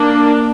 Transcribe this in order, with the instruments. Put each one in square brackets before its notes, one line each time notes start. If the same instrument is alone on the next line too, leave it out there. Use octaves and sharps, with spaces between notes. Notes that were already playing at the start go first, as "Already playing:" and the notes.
Already playing: [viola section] A#3 D4